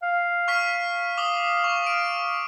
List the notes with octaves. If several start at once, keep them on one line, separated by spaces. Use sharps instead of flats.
F5
C#6 F6 B6
D6 D#6 G7
C#6
D7